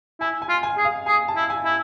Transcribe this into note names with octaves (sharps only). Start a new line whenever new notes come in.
E4 G#5
G#5
F4
G#5
G#4
F5
G#4 G#5
A5
E4
G#5
E4